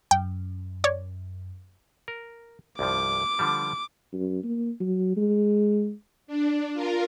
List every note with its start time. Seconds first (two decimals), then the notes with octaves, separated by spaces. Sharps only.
0.11 F#2 G5
0.84 C#5 D5
2.08 A#4
2.79 C2 G2 F3 D6
3.39 D3 F3 G3
4.13 F#2
4.44 A#3
4.80 F#3
5.17 G#3
6.27 D4
6.74 F4 A#4